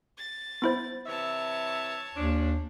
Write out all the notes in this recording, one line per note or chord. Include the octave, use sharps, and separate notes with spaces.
A6
B3 E4 C5
C3 E3 C#5 E5 A5
D#2 F3 C#4 D4